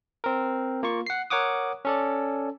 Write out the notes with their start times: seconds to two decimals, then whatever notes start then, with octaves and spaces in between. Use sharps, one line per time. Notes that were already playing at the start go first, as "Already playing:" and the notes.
0.24 C4 A#4
0.83 A#3 F4 C#6
1.06 F#5 C7
1.30 A#4 C#5 F#5 D6 D#6
1.85 C#4 A4 D5